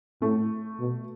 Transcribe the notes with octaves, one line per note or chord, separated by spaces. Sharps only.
A2 A3
B2